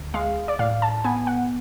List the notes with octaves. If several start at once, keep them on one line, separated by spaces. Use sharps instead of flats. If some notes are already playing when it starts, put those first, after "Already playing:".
Already playing: D2
G#3 F5
D5
A2 F5
A5
B3 G#5
F#5